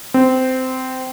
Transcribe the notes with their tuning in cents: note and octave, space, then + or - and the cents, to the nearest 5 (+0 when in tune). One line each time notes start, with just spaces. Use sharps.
C4 -15